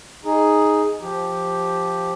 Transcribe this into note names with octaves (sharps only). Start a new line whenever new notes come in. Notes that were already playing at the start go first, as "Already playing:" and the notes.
D#4 G#4
F3 G4